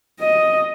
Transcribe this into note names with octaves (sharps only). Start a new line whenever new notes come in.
D#5